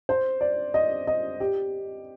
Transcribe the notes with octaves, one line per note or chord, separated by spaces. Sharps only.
C5
D5
D#5
D#5
G4